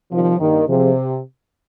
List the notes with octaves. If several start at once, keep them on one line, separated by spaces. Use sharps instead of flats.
C3 D#3 F3 G3
G2 D#3 G3 A#3 D#4
C3 F3 C4 F4 G#4